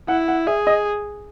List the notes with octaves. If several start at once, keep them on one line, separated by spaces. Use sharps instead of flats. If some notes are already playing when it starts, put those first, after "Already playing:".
E4 F#5
F#5
G#4 E5
D#5